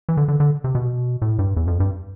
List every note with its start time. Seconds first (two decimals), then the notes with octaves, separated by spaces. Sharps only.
0.09 E3
0.17 D3
0.28 D3
0.40 D3
0.64 C3
0.75 B2
1.22 A2
1.39 G2
1.57 E2
1.67 F2
1.80 G2